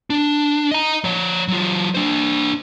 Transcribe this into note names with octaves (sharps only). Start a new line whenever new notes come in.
D4
D#5 A#5
F3 C#5
F#3 F4
D4 C5